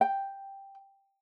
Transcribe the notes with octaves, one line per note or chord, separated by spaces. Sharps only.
G5